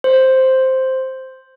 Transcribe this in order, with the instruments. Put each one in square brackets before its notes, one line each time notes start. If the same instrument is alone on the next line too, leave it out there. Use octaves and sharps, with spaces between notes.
[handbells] C5